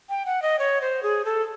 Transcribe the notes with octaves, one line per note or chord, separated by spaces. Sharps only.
G5
F#5
D#5
C#5
C5
G#4
A4